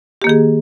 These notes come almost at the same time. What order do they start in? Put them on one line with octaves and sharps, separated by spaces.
G4 A#3 D#3 G#4